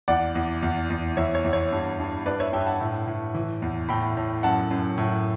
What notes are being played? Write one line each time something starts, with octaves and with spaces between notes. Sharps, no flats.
E2 D5 F#5
E2
E2
E2
E2 C#5 E5
C#5
E2
C#5
G2
G2
G2 B4 D5
C#5 E5
G2 E5 G5
F#5 A5
A2
A2
E3
E2
A2 G5 B5
A2
F#2 F#5 A5
F#2
A2